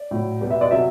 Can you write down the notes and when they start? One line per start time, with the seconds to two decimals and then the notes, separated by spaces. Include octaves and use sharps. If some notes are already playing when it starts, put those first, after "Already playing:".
Already playing: D5
0.11 A2 F#3
0.41 B2 G3
0.50 E5
0.61 D5
0.71 C3 F#3 E5